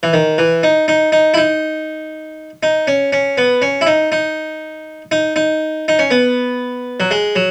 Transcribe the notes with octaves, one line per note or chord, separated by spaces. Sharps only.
E3
D#3
E3
D#4
D#4
D#4
E4
D#4
D#4
C#4
C#4
B3
C#4
E4
D#4
D#4
D#4
D#4
D#4
C#4
B3
F#3
G#3
F#3